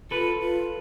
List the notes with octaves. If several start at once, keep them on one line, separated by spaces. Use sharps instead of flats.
F4 A4 B4
F4